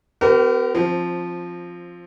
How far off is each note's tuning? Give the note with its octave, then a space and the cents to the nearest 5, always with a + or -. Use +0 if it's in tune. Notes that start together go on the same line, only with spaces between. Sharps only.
B3 +35 G4 -35 A#4 -10
F3 +0 C4 +20